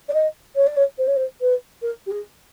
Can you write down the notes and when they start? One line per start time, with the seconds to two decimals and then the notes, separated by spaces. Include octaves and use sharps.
0.09 D5
0.14 D#5
0.56 C#5
0.67 D5
0.76 C#5
0.98 C5
1.07 C#5
1.16 C5
1.41 B4
1.82 A#4
2.06 G4
2.11 G#4